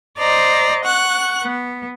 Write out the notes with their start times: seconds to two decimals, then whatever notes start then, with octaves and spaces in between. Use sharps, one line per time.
0.18 C5 D5 D#5 A#5
0.84 F#5 C#6 F#6
1.42 B3